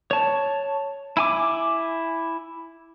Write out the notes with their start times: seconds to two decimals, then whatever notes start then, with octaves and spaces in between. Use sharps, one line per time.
0.11 C#5 A5
1.17 E4 G#5 D6